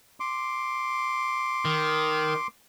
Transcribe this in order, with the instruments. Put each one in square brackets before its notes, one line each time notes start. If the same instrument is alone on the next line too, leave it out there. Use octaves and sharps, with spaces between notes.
[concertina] C6 D6
[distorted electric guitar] D#3